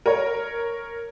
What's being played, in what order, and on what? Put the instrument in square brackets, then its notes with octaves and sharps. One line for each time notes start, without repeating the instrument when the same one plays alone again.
[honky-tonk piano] A#4 C#5